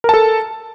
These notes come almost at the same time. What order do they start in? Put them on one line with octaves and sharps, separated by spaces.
A#4 A5 A4